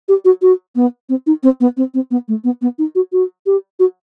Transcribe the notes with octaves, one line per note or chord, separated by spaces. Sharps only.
G4
F#4
F#4
B3
C4
D#4
C4
B3
C4
C4
B3
A3
B3
B3
D#4
F#4
F#4
G4
F#4